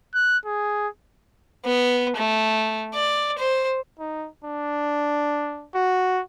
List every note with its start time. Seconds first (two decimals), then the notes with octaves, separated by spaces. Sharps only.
0.14 F#6
0.45 G#4
1.65 B3
2.16 A3
2.95 D5
3.38 C5
4.00 D#4
4.44 D4
5.75 F#4